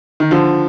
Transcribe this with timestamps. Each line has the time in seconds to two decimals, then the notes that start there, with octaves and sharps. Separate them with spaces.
0.20 D#3
0.31 D3 F3